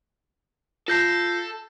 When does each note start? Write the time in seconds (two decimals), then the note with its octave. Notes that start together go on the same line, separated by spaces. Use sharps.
0.88 F4 A4 A5 G6 C7